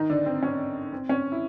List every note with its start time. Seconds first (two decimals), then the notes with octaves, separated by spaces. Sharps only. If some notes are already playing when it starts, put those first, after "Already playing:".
Already playing: D#3 D#4
0.10 D3 D4
0.26 C4
0.43 C#4
0.93 C4
1.09 C#4
1.32 E4